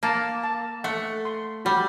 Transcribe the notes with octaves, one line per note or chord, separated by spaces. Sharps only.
A#3 A5
A5
A3 F#5
C6
G3 F#4